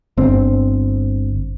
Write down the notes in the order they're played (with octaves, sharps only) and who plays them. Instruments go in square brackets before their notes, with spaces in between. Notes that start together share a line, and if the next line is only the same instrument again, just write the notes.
[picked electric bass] G1 C4